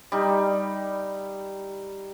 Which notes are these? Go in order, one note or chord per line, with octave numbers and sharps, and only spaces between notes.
G3 D#4